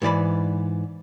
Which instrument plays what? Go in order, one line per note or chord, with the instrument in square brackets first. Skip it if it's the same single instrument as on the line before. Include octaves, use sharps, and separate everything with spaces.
[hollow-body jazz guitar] G#2 E3 D5 B5